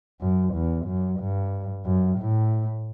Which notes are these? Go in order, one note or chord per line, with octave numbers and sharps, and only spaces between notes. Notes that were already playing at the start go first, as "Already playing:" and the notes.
F#2
E2
F#2
G2
F#2
A2